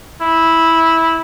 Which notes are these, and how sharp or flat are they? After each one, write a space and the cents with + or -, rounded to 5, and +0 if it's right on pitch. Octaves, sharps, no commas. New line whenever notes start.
E4 -10